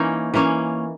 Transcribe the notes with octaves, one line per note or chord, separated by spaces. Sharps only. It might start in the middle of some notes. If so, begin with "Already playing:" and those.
Already playing: E3 A#3 C#4 D#4
E3 A#3 C#4